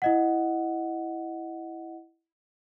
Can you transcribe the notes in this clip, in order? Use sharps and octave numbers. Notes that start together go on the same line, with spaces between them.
E4 D#5 F#5